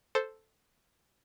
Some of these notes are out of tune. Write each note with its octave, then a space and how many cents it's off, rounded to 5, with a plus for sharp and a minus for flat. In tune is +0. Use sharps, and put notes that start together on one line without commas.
A4 +0 C5 +0